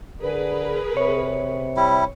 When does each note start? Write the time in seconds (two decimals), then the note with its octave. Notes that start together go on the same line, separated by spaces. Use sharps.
0.22 D3 G#4 A#4 B4
0.97 C3 C#5
1.77 G3 E4